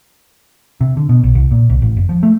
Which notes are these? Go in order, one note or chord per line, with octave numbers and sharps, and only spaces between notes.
C3
D3
B2
B1
C2
A#2
C2
A1
F#1
F3
A3